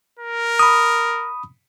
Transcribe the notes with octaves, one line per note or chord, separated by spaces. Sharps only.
A#4
B5 D#6